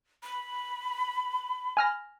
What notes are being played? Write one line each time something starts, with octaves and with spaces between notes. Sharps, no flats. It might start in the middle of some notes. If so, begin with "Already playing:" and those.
B5
G#5 F6 A#6